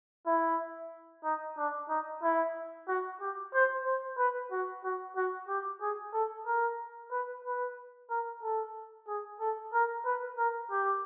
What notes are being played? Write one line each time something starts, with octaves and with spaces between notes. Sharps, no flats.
E4
D#4
D4
D#4
E4
F#4
G4
C5
C5
B4
F#4
F#4
F#4
G4
G#4
A4
A#4
B4
B4
A#4
A4
G#4
A4
A#4
B4
A#4
G4